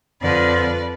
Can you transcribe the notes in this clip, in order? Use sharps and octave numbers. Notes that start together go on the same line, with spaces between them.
F2 D3 F3 B4 D5